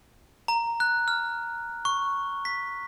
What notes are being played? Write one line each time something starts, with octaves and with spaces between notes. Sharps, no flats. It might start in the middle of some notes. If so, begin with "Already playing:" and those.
A#5
F#6
F6
C#6
B6